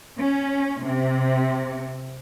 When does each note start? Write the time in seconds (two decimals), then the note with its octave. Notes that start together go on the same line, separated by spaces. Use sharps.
0.19 C#4
0.85 C3